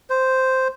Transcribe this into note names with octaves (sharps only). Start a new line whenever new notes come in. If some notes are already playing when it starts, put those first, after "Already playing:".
C5